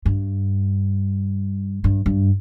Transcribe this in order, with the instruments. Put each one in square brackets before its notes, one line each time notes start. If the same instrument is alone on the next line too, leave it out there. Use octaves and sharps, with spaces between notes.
[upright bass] G2
G2
G2